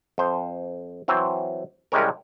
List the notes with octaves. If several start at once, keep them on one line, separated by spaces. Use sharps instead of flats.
F2 C5
E3 F#3 C4 C5
C2 C3 G3 G#3 C#4 A#4